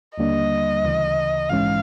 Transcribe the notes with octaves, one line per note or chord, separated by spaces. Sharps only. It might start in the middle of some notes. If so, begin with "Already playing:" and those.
D#2 D3 G3 A#3 D4 D#5
D2 C#3 E3
A#1 G#2 E3 G#3 C#4 F5